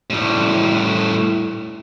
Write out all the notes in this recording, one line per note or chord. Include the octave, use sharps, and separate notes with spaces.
A2 G3